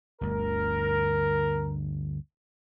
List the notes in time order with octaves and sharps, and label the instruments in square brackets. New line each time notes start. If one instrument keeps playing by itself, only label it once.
[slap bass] G1 D2 [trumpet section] A#4